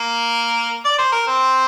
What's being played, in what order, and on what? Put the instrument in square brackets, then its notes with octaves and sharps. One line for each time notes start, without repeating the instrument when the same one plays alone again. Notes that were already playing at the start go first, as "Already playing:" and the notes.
Already playing: [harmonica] A#3 A#4
D5
C5
A#4
C4 C5